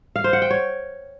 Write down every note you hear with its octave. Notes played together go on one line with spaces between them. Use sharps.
F5
C5
F#5
G5
C#5